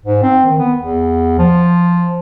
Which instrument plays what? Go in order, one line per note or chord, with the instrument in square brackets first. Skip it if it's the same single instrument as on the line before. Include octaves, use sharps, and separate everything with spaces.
[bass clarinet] G#2
C4
D#3
B3
E2
F3